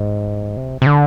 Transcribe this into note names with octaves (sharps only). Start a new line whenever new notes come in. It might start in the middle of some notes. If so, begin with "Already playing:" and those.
Already playing: G#2
C3
C3
D3